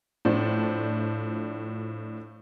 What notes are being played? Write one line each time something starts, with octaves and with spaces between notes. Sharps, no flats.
A2 F3 D4 C5